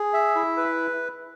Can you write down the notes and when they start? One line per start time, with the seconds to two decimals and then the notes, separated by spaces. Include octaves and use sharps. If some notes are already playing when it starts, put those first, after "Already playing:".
Already playing: G#4
0.13 E5
0.36 E4
0.57 B4